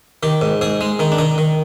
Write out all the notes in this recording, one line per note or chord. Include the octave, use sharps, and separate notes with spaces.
D#3 G4
G#2
G#2 G#4
G#3
D#3 D#4
D4
D#3 D#4
D#3